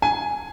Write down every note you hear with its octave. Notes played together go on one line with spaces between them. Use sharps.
G#5